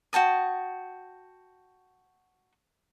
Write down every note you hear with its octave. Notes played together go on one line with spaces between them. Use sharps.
F#4 G5 A5 D#6